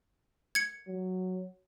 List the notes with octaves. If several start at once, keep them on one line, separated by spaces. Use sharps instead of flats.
G#6 C#7
F#3